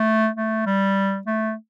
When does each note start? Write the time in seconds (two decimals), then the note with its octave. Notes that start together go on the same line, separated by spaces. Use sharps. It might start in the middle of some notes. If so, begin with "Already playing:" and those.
Already playing: A3
0.36 A3
0.66 G3
1.27 A3